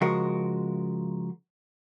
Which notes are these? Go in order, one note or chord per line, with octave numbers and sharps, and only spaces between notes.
C#3 F3 G#3 F#4 A#4